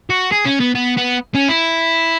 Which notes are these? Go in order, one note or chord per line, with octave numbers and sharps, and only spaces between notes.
F#4
G#4
C#4
B3
B3
B3
C#4
E4